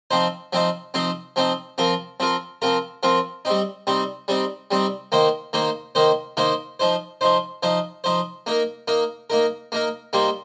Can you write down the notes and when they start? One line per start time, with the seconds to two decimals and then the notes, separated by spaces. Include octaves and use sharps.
0.11 F3 C4 D#4 C5
0.53 F3 C4 D#4 C5
0.94 F3 C4 D#4 C5
1.36 F3 C4 D#4 C5
1.78 F3 C4 F4 A#4
2.20 F3 C4 F4 A#4
2.62 F3 C4 F4 A#4
3.03 F3 C4 F4 A#4
3.45 G3 C4 D#4
3.87 G3 C4 D#4
4.28 G3 C4 D#4
4.71 G3 C4 D#4
5.12 D#3 A#3 D#4 C5
5.53 D#3 A#3 D#4 C5
5.95 D#3 A#3 D#4 C5
6.37 D#3 A#3 D#4 C5
6.80 F3 D#4 C5
7.21 F3 D#4 C5
7.63 F3 D#4 C5
8.04 F3 D#4 C5
8.46 A#3 D#4 A#4
8.88 A#3 D#4 A#4
9.30 A#3 D#4 A#4
9.72 A#3 D#4 A#4
10.13 G3 A#3 D#4 C5